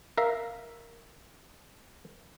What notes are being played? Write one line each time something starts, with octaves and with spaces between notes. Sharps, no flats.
A#4 E5 F5